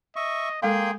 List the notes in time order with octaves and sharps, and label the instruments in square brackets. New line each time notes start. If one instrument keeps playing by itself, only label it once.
[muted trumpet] D#5 [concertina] E5 C#6
[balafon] G#3 A4 F5 [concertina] A#3 G5 C6 [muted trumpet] G#4